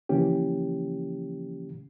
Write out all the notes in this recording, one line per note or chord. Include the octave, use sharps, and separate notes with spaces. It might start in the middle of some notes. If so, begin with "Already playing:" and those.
C#3 E3 F3 A#3 C#4 G4